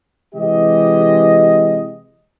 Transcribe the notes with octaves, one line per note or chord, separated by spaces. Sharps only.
C3 E3 G#3 G4 D#5